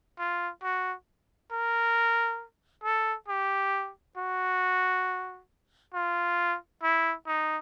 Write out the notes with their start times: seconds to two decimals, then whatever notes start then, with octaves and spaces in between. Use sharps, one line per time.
0.19 F4
0.63 F#4
1.52 A#4
2.84 A4
3.29 G4
4.18 F#4
5.94 F4
6.83 E4
7.27 D#4